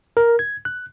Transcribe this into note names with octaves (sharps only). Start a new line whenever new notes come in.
A#4
G#6
F#6